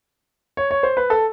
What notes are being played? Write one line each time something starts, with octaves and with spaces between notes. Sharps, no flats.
C#5
C#5
C5
B4
A4